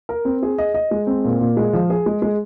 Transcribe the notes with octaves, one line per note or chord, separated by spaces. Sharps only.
A#4
C4
G#4
D#5
D#5
G#3
C4
A#2
A#2
G#3
F3
G#4
G#3
G#3